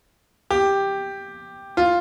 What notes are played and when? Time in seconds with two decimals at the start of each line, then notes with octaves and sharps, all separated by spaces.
0.50 G4
1.77 F4